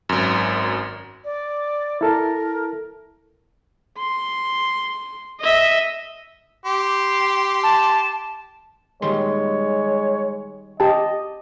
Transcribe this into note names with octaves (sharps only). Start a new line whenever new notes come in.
G#1 F#2
D5
E4 A4 A#4 A5
C6
D#5 E5
G4 C6
A5
D#3 G3 G#3 C#5 C6
G4 D#5 A5